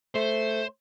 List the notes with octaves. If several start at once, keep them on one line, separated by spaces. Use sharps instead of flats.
A3 C5